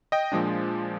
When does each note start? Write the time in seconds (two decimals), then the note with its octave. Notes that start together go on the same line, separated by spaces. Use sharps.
0.12 D#5 G5
0.32 A#2 F3 G#3 D4